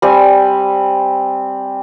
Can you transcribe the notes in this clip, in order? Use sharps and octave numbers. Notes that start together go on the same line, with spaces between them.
G3 C4 G#5